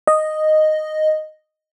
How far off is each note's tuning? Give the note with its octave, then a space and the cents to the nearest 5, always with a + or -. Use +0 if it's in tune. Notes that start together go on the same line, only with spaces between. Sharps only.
D#5 -5